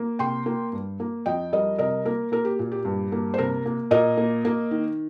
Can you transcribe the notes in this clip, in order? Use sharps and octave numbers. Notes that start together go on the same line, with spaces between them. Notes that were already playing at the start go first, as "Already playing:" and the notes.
Already playing: A#3
C3 G5 C6
A#3
G2
A#3
F2 D#5 G5
G3 A#4 D#5
C3 A#4 D#5
A#3 A#4
A#3 A#4
G4
A#2
G4
G2
A#3
C5
C3 A#4
A#3
A#2 A#4 D#5
A#3
A#3
D#3